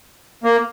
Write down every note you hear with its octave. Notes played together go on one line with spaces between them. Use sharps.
A#3